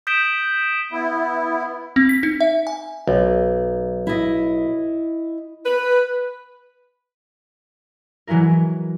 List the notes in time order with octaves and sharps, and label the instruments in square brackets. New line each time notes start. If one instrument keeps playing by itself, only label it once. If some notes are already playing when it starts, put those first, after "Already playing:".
[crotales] D#6 G6 B6 D7 E7 G7
[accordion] B3 E4
[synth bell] C4
B6
D#4
E5
G#5
[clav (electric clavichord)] B1
[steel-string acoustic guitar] E4 D#5
[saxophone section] B4
[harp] E3 F#3 G#3 E4 A#4